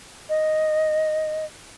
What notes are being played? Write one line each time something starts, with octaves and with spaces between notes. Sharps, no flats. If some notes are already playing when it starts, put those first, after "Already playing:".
D#5